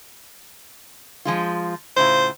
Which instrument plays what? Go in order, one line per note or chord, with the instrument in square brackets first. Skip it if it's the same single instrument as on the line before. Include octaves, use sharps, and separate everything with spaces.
[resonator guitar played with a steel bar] F3 G#3 F4
[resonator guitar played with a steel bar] A2 C#3 F4 [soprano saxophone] C5